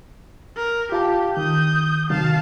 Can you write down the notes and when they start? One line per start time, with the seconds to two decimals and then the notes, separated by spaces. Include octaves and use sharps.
0.56 A#4
0.92 F4 G4 F5 A5
1.37 D#3 D#6 G6
2.10 C3 D#3 F#3 F5 A5